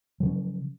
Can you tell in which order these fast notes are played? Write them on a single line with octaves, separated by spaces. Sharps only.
F#3 C#3 C#4 F3